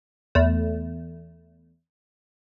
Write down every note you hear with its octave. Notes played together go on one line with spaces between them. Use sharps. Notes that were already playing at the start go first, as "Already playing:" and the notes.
E2 A3